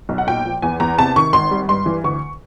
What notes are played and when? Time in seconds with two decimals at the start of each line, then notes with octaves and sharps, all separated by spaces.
0.09 B1
0.18 F#5
0.27 A#2 G5
0.45 F3
0.62 E2 G#5
0.80 E2 A#5
0.98 C3 A5
1.16 D#3 C#6
1.33 G#1 C6
1.51 G3
1.69 G2 C6
1.86 E3
2.04 D2 C#6